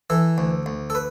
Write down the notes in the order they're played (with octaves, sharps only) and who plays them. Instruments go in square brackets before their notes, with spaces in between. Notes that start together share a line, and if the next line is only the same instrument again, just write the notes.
[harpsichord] E3 A4
D2
D2
A4
B4